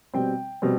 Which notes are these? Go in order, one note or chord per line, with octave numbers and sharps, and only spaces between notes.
B2 G3 C4 G5
B2 G3 C4